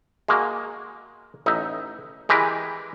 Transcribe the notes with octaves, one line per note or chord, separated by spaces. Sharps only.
G#3 A#3 F#4
A1 D#4 E5
E3 G#3 G4 A#4 B4